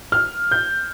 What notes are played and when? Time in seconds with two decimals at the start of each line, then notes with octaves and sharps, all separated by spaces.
0.12 F6
0.51 G6